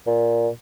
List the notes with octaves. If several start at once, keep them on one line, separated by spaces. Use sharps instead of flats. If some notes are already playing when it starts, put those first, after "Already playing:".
A#2